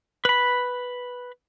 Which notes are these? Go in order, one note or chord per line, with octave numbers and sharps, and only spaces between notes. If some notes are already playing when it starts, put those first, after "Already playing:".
B4 B5